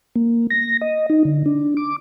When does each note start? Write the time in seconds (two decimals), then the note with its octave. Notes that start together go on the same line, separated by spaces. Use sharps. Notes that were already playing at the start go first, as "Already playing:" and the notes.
0.16 A#3
0.50 A#6
0.81 D#5
1.10 D#4
1.25 D3
1.46 D4
1.77 D6